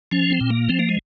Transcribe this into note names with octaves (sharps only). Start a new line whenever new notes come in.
F3 C#4
C4
A#2
A#3
F3 C4
A#3
G#3